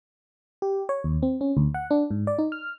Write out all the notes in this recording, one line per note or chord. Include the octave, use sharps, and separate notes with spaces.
G4
C#5
D#2
C4
C#4
D2
F#5
D4
G#2
D5
D#4
F6